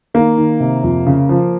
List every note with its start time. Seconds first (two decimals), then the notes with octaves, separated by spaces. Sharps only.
0.14 D#3 A#3
0.38 D#3
0.60 C3
0.83 F2
1.06 C#3
1.29 F3